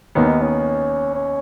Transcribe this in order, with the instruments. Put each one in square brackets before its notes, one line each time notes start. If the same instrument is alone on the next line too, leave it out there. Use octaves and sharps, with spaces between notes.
[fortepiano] D#2 D#3 B3 [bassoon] C#4
[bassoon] D#4
C#4
C#4